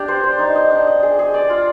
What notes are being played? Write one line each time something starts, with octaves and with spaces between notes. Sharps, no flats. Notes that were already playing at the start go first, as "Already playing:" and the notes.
Already playing: D4 G4
C5
C5
D#4
D#5
D4
D#5
G#4
G#4
D5
F4